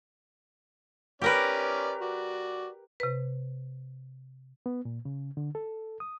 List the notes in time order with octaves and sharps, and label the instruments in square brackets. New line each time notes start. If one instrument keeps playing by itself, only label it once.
[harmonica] C#4 D5 [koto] G4 A#4 B4
[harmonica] F#4 D5
[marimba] C3 B4
[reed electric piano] B3
A#2
C#3
D3
A4
D#6